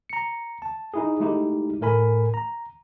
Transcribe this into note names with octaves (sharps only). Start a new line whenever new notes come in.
A#5 C#7
A5
D#4 E4 G#4
G#3 A3 D#4 E4 G4
A2 A3 A#4 G#5 B5
A#5